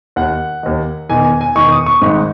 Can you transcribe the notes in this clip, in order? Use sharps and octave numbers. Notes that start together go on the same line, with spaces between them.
D#2 D#3 F#5
D#2 D#3
E1 E2 D#3 G#5
G#5
G#5
E1 E2 D#3 C#6
D#6
C#6
G#1 G#2 D#3